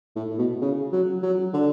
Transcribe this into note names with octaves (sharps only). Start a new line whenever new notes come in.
A2
A2
B2
C#3
F#3
F#3
D3